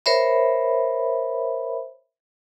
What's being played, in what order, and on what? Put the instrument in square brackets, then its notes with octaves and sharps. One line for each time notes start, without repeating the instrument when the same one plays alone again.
[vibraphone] A#4 C5 C#5 E5 B5